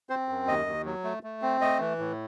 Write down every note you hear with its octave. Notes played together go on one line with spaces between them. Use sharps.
C4 C5
F#2
D#2 D#5
D#2
F#3
A3
A3
C4
A3 D#5
E3
A2